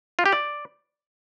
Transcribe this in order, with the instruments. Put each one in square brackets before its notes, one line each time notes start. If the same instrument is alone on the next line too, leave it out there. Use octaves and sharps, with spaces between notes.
[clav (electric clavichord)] F4
G4
D5